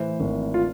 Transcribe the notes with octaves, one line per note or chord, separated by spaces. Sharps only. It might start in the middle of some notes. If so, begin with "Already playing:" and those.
Already playing: A2 E3 C5
G#1
F4